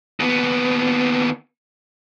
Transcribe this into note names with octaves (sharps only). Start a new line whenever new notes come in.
D#2 B3